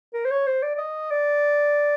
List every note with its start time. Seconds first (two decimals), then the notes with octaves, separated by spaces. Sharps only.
0.14 A#4
0.25 C5
0.31 C#5
0.47 C5
0.62 D5
0.75 D5
0.78 D#5
1.11 D5